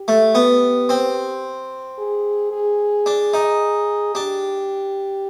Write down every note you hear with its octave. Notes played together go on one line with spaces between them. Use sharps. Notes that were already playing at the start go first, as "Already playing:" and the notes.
Already playing: G4
A3
B3
C4
G#4
G#4
D4
D#4
D4 G4